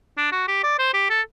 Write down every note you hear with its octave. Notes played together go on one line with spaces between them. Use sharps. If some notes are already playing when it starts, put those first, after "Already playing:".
D4
F#4
G4
D5
C5
G4
A4